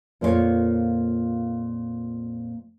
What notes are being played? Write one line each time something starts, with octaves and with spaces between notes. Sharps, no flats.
F2 A#2 A#3 D4 F4 C#5